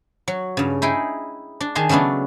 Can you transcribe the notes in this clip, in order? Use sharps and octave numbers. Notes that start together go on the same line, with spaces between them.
F#3
G2 C#3
D#4 E4 G#4 G5
D4
D#3 G#4 G#5 A5 C6
C#3 F#3 A3 B3 D4